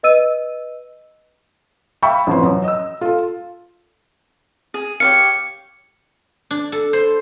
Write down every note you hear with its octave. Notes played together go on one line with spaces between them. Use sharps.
B4 D#5 E6 D#7
E5 F5 G5 A5 B5 C#6
A1 F2 B4 C6
F#2
D#5 E6
F4 A4
G#4
G4 C#5 F5 C#7
D4
A4
C5